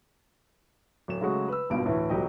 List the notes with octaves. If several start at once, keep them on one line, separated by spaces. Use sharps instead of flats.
D1 E7
C#3 F#3 G#3 A3 F#4 C#5
B4 E6
G#1 G2 B2 F4 D7
D2 A2 E3
D#1 C#2 F#3 G4 D#5